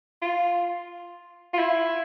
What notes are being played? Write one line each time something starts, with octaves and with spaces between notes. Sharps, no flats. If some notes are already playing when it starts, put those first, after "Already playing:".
F4
F4
E4